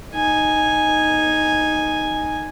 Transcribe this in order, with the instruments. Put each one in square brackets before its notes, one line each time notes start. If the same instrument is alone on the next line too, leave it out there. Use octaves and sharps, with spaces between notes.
[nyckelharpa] D#4 G#5